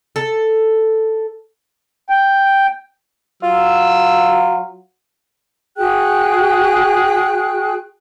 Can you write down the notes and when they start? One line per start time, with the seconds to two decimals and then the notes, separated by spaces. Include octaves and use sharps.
0.16 A4
2.09 G5
3.43 F#3 F4 E6
5.77 F#4 G#4 G5 F#6